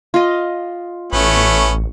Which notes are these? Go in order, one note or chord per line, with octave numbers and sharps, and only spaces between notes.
F4 D#5
A1 A3 B3 C#4
C#6